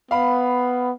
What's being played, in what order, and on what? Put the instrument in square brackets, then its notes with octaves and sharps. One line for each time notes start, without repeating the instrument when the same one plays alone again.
[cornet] B3 [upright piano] F5 B5